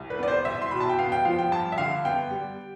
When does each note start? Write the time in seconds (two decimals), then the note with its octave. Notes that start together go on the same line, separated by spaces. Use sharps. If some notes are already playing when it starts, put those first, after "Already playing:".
Already playing: C2
0.10 B4
0.19 B3 D5
0.28 C5
0.45 C2 E5
0.62 C6
0.71 B2 B5
0.80 A5
0.89 G5
0.99 B3 F5
1.12 G5
1.25 F3 F5
1.39 G5
1.51 G2 A5
1.72 E5
1.78 D3 F5
2.05 B3 G5
2.31 G3